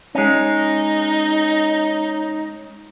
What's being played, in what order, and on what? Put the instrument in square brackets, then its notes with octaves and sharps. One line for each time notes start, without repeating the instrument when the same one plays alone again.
[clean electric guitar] G#3 C#4 [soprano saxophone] D#4